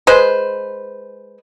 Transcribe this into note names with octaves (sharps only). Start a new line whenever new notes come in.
G#3 B4 C5